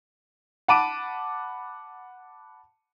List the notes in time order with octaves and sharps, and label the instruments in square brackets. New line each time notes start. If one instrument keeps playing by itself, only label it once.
[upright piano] F#5 A5 B5 D6 D7 D#7